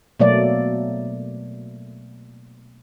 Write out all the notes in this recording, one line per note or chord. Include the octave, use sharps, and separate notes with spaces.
B2 F#3 A3 A#3 D5